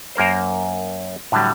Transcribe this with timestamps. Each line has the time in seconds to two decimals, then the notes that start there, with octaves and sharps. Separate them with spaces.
0.15 F#2 A#3 A#4 C5
1.32 A2 D3 F#3 G3